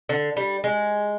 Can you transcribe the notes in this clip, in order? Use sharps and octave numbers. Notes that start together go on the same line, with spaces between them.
D3
G3
G#3